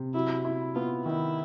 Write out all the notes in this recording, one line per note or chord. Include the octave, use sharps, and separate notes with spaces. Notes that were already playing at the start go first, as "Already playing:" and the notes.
Already playing: C3
F#3 E4
E4
B3 F4
D#3 E4